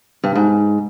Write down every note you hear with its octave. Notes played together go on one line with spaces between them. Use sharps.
G2
G#2